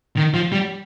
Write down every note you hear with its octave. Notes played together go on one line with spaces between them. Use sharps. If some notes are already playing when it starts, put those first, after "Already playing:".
D#3
F3
G3